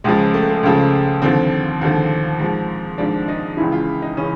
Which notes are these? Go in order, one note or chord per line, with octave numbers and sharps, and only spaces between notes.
C#2 C#3 F3 G#3
A3
A3
C#2 C#3 F3
D#2 D3 F3 C4
D#2 D3 F3
G#2 F3
G#2 F3 D4
D#4
C#2 C#3 E3 E4
F4
D#4
C#3 E3 C#4